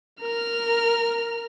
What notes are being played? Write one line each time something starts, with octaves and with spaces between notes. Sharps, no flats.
A#4 F6